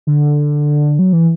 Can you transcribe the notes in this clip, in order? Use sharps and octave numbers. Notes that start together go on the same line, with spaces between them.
D3
F#3
E3